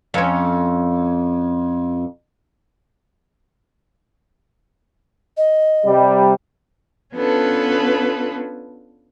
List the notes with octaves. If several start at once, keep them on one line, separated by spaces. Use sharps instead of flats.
F2 C#4
D#5
C3 G3
B3 C#4 D4 F4 A4 B4